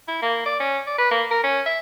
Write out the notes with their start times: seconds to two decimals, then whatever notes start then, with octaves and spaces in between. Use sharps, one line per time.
0.08 E4
0.22 A#3
0.46 D5
0.60 C#4
0.87 D5
0.98 B4
1.11 A#3
1.31 A#4
1.43 C#4
1.66 E5